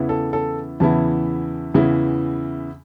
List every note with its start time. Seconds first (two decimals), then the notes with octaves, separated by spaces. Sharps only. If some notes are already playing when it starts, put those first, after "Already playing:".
Already playing: E2 C#3 E3 B3 E4
0.09 A4
0.33 A4
0.80 E2 C#3 E3 B3 E4 A5
1.74 E2 C#3 E3 B3 E4